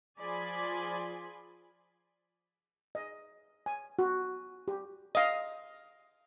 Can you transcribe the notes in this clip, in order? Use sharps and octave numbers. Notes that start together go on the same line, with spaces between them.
F3 G#4 D5 G#5 B5 C6
D#5
G#5
F#4
G4
D#5 F5